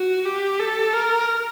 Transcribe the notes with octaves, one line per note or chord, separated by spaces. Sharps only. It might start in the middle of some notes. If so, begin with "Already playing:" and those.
Already playing: F#4
G4
A4
A#4